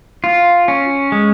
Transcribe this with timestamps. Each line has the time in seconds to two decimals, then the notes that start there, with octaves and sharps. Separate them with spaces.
0.24 F4
0.68 C#4
1.12 G#3